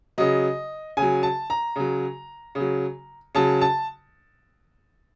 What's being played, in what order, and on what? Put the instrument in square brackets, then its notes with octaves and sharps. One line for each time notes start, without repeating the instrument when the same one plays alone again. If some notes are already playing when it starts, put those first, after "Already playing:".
[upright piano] C#3 F#3 D#5
C#3 F#3 G#5
A5
A#5
C#3 F#3
C#3 F#3
C#3 F#3 A5
A5